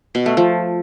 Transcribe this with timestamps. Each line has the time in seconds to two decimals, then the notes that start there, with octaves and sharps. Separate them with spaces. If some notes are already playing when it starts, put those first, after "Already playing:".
0.15 B2
0.26 A3
0.37 F3